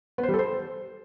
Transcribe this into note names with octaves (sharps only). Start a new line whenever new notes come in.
B3
C5
G3
A4
C5